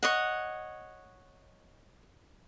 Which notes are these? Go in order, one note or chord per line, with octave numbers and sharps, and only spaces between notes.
C#5 D#5 F#5